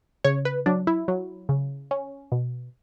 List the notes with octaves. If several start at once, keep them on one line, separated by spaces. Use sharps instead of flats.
C#3 C#5
B4
F#3 D4
E4
F#3
C#3
C#4
B2